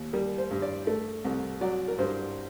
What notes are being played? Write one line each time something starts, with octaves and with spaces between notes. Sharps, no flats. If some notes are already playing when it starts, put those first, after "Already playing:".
Already playing: D#2
G3 A#4
C5
G2
D5
A3
C2
F#3 D5
A#4
G2 C5